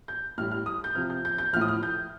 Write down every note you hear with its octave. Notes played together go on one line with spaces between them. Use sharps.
G6
A2 G3 F6
F6
D#6
G6
C3 F3 F6
G6
G6
G6
A2 F3 D#6 F6
F6
G6